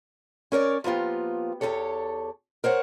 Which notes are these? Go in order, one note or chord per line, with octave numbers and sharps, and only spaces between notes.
C#4 A#4 C#5 D5
F3 A#3 B3 F4 G4
E2 G#2 G4 A4 C#5
A#4 C5 C#5 F#5